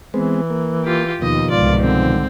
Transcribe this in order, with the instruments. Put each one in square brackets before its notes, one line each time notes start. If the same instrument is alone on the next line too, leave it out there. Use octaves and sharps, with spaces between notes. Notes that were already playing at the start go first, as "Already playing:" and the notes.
[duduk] E3 [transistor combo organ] G#3 B3 C4
[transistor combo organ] A#3
[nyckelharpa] F4 G4
[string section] D#2 [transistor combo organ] B2 F3 [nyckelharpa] D#5
[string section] C2 G#2 D#3 [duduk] F4 [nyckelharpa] D5
[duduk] D3 [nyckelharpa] C4